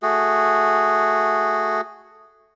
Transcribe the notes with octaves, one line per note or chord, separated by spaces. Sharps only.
A3 F#4 G#4